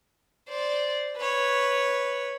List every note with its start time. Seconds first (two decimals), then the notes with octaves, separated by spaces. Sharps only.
0.49 C5 D5
1.17 B4 C#5